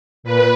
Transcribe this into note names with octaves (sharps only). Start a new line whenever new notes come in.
A#2 B4